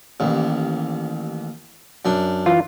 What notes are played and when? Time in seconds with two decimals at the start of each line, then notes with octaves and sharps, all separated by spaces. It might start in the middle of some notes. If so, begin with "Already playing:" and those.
0.20 A1 D#2
2.05 F#2 D4
2.46 E3 F4